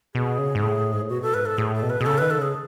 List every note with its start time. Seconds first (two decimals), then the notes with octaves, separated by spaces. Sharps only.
0.15 B2 G#4
0.39 C#3
0.55 G#2
0.63 A2
0.93 G#2
1.02 A2
1.10 B2 F#4
1.22 A4
1.34 G#2 B4
1.46 A4
1.58 A2 G#4
1.74 A4
1.83 B2
1.90 B4
2.01 B2 G#4
2.06 C#3 A4
2.18 D#3 B4
2.30 A4
2.38 C#3 G#4